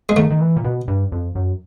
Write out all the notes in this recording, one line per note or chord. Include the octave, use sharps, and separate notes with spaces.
G#3
D#3 A3
D#3
E3
A#2
B2
G2
F2
F#2